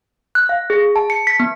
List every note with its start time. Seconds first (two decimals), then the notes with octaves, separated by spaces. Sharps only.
0.35 F#6
0.49 F5
0.70 G#4
0.96 A5
1.10 C#7
1.27 B6
1.40 B3